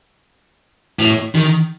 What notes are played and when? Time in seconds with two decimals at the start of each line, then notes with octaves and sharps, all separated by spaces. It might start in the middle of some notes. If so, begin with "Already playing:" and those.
0.99 A2
1.35 D#3